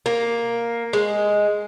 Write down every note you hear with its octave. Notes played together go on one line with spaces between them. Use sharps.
A#3
G#3